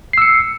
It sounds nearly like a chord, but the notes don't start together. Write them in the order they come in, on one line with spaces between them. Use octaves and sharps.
C7 E6 C#7